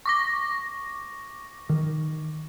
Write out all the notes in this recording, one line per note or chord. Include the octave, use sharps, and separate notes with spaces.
C#6 D6 A#6
D#3